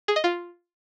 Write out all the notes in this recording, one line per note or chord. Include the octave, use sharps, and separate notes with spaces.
G#4
D#5
F4